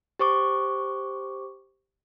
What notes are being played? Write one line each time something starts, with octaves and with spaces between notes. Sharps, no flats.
G4 C5 C#6 D6